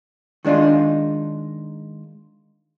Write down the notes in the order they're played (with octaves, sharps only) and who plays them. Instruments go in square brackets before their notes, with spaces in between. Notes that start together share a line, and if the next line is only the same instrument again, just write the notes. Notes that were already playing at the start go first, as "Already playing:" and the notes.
[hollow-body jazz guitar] D#3 G#3 D4 D#4 F4